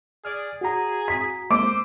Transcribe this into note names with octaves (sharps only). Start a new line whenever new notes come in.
G#4 D5 F6
F#4 G#4 A#5
B6
G#3 A#3 C5 D6 E6 D7